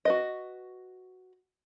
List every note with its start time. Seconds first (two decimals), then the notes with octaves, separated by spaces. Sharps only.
0.05 F#4 B4 D#5